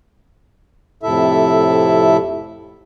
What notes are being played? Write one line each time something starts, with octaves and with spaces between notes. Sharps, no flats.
F2 A2 C3 E4 A4 E5